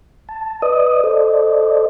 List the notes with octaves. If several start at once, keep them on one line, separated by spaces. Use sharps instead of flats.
A5
B4 D5 D#5 D#6
A4 C5 D5 D#5